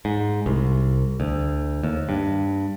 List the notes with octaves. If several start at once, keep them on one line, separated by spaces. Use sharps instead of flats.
G#2
C2
D2
D#2
G2